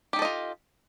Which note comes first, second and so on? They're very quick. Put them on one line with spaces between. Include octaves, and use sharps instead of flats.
G4 D#4 A4 D#5 F4